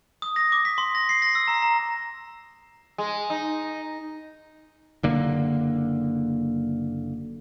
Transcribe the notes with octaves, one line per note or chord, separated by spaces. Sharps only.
D#6
A#6
D6
B6
C6
A#6
C7
A#6
E6
A#5
A#5
G#3
D#4
F#1 D3 A#3